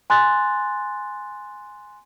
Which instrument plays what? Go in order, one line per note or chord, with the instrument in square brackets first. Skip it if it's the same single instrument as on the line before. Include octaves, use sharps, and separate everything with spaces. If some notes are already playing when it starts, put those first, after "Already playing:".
[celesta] G#5 C6 F#6 A6